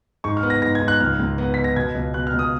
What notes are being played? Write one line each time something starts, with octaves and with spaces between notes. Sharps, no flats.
G#2 C#6
F6
B3
A#6
G#2 A#6
G#6
G#2
F#6
C#2 F6
C#2
B3
B3 B6
A#6
B2 G#6
C#2
B2 F#6
F6
C#2
D#6